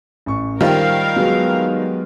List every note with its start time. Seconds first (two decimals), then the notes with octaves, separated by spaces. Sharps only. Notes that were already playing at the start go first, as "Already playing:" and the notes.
0.26 A1 C#6
0.61 D#3 G3 F4 A#4 C5 F5 G5
1.16 F#3 G#3 B3